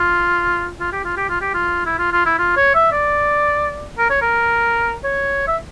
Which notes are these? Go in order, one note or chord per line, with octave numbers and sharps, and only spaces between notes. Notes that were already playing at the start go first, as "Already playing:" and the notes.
Already playing: F4
F4
G4
F4
G4
F4
G4
F4
E4
F4
F4
E4
F4
C#5
E5
D5
A#4
C#5
A#4
C#5
E5